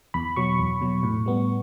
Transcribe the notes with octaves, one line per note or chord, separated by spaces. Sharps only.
E2 B5
B2 F#3 C#6
E2
B2 F#3
A2
G3 B3